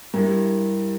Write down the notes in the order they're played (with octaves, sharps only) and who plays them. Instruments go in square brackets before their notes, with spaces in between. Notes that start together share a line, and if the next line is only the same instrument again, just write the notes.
[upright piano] G2 [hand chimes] E4 G4 A#4